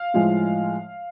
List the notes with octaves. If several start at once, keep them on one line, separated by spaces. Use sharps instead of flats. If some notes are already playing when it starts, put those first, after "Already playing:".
Already playing: F5
A2 F3 G#3